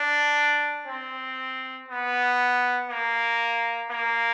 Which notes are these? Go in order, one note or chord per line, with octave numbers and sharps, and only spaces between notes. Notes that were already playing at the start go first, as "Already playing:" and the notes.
Already playing: D4
C4
B3
A#3
A#3